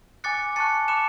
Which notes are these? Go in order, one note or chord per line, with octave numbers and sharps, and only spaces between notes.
G#5 D6 F#6 A6 C#7
A5 C#6 F#6 A6 C#7
B5 D6 F#6 C#7 E7